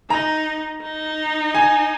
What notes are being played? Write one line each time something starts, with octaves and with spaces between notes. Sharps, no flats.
D#4 A#5
D#4
G#5